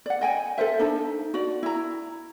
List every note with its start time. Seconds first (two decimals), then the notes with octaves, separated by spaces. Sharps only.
0.06 D5 F#5
0.21 D#5 G5 G#5
0.58 A4 A#4 C5 E5
0.79 D4 D#4 A4
1.34 F#4 D5
1.63 E4 A#5